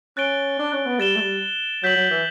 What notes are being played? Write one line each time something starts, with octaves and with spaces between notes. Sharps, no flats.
C#4 F#6 A6 D7 G7
D4
C#4
B3
G3 A6 E7 G7
A3
G3
F#3 G6 B6 F#7
F#3
E3